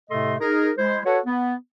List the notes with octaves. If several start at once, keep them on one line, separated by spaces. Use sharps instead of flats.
A2 C3 A3 A4 D#5 C6
D#4 G#4 A#4
G#3 E4 C5
F#4 A4 B4 C#5
B3